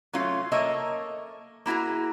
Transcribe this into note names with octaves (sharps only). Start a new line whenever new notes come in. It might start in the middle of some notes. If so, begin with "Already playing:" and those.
F#3 A3 C#4 F4
A#3 A4 A#4 C#5 D#5 E5
A#3 E4 F#4 G#4 A#5